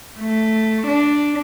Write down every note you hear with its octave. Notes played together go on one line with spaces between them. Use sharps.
A3
D4